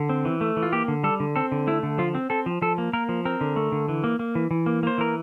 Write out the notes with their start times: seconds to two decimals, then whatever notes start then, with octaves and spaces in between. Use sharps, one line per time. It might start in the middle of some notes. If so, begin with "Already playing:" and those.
Already playing: D3
0.09 C4
0.25 E3
0.41 A3
0.57 E3
0.63 F4
0.72 A#3 G4
0.88 D3
1.03 G3 A4
1.20 D3
1.36 C4 A4
1.52 D3
1.67 A3 E4
1.83 D3
1.98 F3 F4
2.15 C4
2.30 C4 A4
2.46 F3
2.62 F3 A4
2.78 A#3
2.93 A#3 A#4
3.09 F3
3.25 C4 A#4
3.41 D3
3.56 A3
3.72 D3
3.89 E3
4.04 A#3
4.19 A#3
4.35 E3
4.51 E3
4.66 A#3
4.83 A#3 C5
4.98 E3 A#4